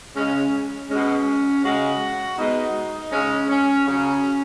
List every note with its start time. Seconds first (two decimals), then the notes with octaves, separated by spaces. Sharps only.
0.15 C#3 G#3 C#4
0.90 B2 G#3 C#4
1.64 C#3 G#3 F#4
2.38 B2 G#3 D#4
3.12 C#3 G#3 C#4
3.49 C#4
3.87 C#3 F#3 C#4